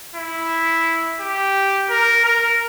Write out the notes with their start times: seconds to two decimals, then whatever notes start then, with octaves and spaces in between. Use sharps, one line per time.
0.16 E4
1.20 G4
1.90 A#4
2.25 A#4